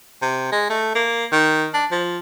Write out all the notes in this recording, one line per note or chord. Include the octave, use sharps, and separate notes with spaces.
C3
G#3
A3
A#3
D#3
D4
F3